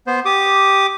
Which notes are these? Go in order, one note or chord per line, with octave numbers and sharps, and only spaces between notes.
B3 C5
G4 D6 D#6